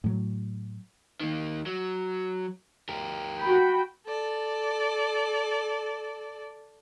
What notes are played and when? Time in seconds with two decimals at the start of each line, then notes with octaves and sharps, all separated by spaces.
0.04 A2 F#3
1.20 D#3 A#3
1.66 F#3
2.89 G4 A#4
3.41 F#4 G5 B5
4.06 A4 D5